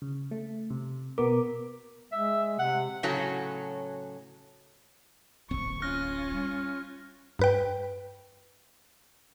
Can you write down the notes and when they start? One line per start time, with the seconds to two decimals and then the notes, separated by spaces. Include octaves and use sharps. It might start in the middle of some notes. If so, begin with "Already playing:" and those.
0.02 C#3
0.31 A3
0.70 C3
1.18 B2 B3 A#4 D6
2.12 G#3 E5
2.59 C3 F#5
3.03 A2 C#3 F#3 C#4 F#4 A4
5.51 D1 A1 A#3 C4 C#6
5.82 C#4 F4 F6 F#6 A#6
6.31 G3
7.39 G2 B4 G5